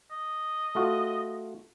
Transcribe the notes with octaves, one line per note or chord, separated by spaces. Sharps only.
D#5
A3 F4 F#4